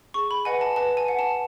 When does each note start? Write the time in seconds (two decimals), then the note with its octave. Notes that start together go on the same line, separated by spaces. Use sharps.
0.14 G#4 C#6
0.31 B5
0.45 B4 D#5 F#5 G#5
0.61 A5
0.76 B4 A5
0.97 G#5
1.08 F#5
1.19 A5